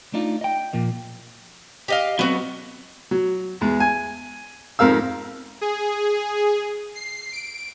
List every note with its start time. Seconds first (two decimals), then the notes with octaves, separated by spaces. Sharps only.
0.13 A3 D4 D#4 F4
0.41 D#5 G5
0.73 A#2 F3 A#3
1.88 G4 D#5 F5
2.19 F#3 B3 C4 F#4
3.11 F#3
3.61 E2 G#3
3.80 G#5
4.79 F2 G#2 A#4 F5 E6
5.61 G#4
6.95 C7
7.32 D7